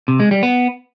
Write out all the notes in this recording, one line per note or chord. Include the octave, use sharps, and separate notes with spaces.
C3
G#3
G3
B3